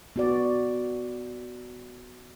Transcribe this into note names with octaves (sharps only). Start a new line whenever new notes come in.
B3 F#4 D5